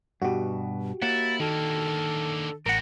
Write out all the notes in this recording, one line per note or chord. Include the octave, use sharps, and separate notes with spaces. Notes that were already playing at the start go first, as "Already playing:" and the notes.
G2 B2 F#4 G4
A#3 E4 C#5 F#5 A6
D3 D#3 A#3 A4
A1 A2 G3 A#4 F#5 A#6